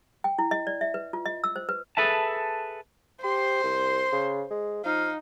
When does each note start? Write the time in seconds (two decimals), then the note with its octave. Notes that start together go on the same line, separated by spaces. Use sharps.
0.24 G5
0.39 E4
0.51 D#5
0.67 D5
0.81 E5
0.94 B4
1.13 F4
1.26 D#5
1.44 E6
1.56 C5
1.69 B4
1.97 G#4 A4 B4 E5 A5
3.24 G4 C5 C6
3.64 C2
4.12 C#3
4.51 G#3
4.85 F3 D#4 F5